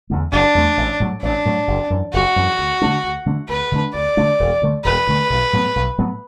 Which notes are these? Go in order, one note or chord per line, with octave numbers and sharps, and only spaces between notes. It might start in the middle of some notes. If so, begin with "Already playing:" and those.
E2 D3 A3
F#1 D4
E2 D3 A3
A1
A2 F#3 A3
A1 D4
A2 F#3 A3
F#1
F#2 E3
F#1 F#4
F#2 E3
D2
D3 A3 D4
D2
D3 A3 D4
D2 B4
D3 A3 D4
D2 D5
D3 A3 D4
E1
D2 D3 A3
E1 B4
D2 D3 A3
B1
A2 F#3 B3
B1
A2 F#3 B3